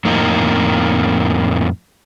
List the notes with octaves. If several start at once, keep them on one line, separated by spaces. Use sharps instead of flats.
F2 A2 A#3 D#4